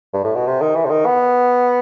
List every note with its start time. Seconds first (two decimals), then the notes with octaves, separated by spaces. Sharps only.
0.14 G2
0.24 A2
0.35 B2
0.47 C3
0.61 D#3
0.76 E3
0.85 C3
0.91 D#3
1.06 B3